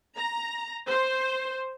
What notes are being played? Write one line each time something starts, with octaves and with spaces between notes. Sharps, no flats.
A#5
C5